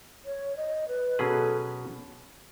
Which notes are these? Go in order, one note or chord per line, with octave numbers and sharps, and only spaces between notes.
C#5
D#5
B4
B2 F#3 C#4 G#4 A4 B4